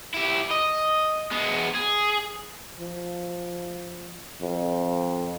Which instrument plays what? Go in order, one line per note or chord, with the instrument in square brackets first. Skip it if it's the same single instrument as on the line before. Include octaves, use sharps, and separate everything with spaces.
[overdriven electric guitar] E4 G4
D#5
G#3 B3
G#4
[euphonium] F3
F2